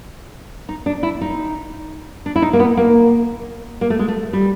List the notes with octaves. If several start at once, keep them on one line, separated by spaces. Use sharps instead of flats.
D#4
D4
E4
D#4
D4
E4
D#4
A#3
B3
A#3
A#3
A3
G#3
A3
G3